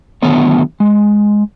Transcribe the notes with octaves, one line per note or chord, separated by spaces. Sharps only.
D3 D#3 F#3 A3 B3 C#5
G#3